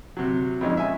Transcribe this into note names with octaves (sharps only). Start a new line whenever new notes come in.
C3 F#3
F2 A#2 G#3 C#4 D#4
E5 G#5